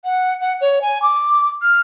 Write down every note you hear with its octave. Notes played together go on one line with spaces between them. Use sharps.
F#5
F#5
C#5
G#5
D6
F6